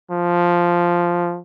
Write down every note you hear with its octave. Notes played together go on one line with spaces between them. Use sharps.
F3